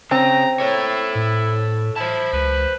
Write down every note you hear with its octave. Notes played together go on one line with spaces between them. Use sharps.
C#3 C4 A#5
E4 A4 C#5
A2
E4 C5 A5
C#2 B4